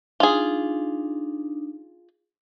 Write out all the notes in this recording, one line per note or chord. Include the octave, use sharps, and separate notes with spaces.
D4 D#4 F4 G#4